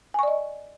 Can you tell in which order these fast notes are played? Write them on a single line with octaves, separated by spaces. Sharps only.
G#5 C#6 D5 D#5